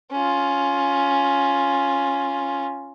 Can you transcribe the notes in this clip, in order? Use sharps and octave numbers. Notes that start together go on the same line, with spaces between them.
C#4 F4